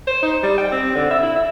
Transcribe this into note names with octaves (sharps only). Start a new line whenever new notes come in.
C5
D#4
G3
G5
C4
D3
E5
E4
E5